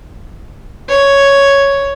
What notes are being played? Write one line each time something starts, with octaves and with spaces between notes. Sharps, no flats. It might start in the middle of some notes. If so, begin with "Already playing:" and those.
C#5